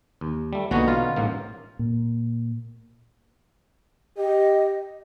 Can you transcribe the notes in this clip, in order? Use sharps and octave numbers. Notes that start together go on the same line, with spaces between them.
D#2
G3 A3
B1 D3 E3 A#3 B3 C#4 D#4 F#4
B2 F4 F6
A1 G#2 A#3
A#2
G4 D#5